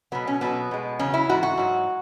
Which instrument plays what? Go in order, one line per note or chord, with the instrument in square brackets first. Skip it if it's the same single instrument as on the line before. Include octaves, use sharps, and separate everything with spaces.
[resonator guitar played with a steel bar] B2 F#3 B3
C#4
B2 F#3 B3
B2 G#3
E2 C#3 F#3 C#4
E4
G#2 E3 F#4
F#4
G#2 F#3